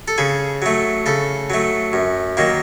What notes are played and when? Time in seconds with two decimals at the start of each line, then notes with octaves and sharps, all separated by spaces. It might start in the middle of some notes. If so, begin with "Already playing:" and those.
0.08 A4
0.18 C#3 G#4
0.62 F#3 A3
1.06 C#3 A4
1.50 F#3 A3
1.93 F#2
2.37 D#3 F#3 A#3